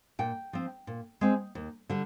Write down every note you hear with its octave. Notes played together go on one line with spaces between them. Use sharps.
A#2 G5
F3 C4
A#2
G#3 C4
D#2
D3 G3